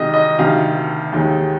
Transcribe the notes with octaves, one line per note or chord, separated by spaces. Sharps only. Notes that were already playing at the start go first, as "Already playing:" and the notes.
Already playing: C2 C3 D#3 G#3 D#5
D#5
D2 C3 D#3 F5
D#2 D#3 G#3